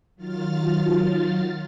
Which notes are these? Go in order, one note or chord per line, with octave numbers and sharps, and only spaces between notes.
D#3 F#3 F4 F6 A6